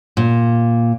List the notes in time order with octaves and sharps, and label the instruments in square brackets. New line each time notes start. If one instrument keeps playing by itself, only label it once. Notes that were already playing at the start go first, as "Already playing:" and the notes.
[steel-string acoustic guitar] A#2